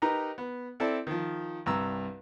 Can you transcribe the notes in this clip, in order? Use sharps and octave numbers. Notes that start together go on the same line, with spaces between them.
D#4 G4 A#4 B4 A#5
B3
C4 E4 A4 D5 A5
D#3 F3
C2 G2 A#5 E6